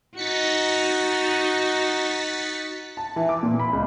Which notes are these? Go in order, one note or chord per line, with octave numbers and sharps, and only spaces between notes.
D#4 F#4 A6 B6 C#7
A5
E3
D6
A#2
B5
C#2